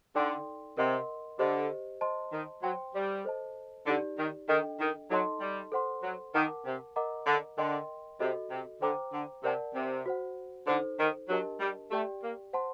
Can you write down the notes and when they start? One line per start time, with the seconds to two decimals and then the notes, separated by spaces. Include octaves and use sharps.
0.15 D3 D#4 A4 D5 G5 C6
0.77 C3 A#4 D#5 F#5 C6
1.39 D3 G4 C5 D#5
2.01 C5 D#5 A5 C6
2.32 D#3
2.63 F#3 C5 G5 C6
2.94 G3
3.25 A4 C5 D#5 A5
3.87 D3 D#4 G4 D5
4.18 D#3
4.49 D#3 D4 A4 D#5 G5
4.80 D#3
5.11 F#3 D#4 A4 D#5 A5 C6
5.41 G3
5.72 A4 C5 F#5 C6
6.03 F#3
6.34 D#3 A#4 F#5 A5 D6
6.66 C3
6.96 A#4 D#5 F#5 A#5 D6
7.27 D3
7.58 D3 A#4 D#5 G5 C6
8.20 C3 F#4 A4 D#5
8.51 C3
8.82 D3 C5 G5 A#5 D6
9.13 D3
9.43 C3 A#4 D5 F#5 A5
9.74 C3
10.06 F#4 C5 F#5
10.67 D3 D#4 A4 C5
10.99 D#3
11.29 F#3 D4 G4 A#4 D#5 A5
11.60 G3
11.91 A3 G4 D5 G5
12.23 A#3
12.53 C5 F#5 A5 C6